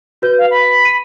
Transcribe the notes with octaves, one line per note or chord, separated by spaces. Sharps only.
F#4 B4 G6
F5
B5
D#7